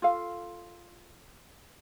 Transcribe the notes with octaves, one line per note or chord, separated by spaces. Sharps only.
F4 A4 F5